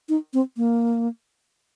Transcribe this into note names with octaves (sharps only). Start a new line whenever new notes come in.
D#4
C4
A#3